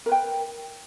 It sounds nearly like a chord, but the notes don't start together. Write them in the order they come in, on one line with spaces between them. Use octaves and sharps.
A#4 B4 G5